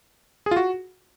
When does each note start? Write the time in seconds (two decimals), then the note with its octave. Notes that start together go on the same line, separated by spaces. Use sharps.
0.46 G#4
0.51 F4
0.57 F#4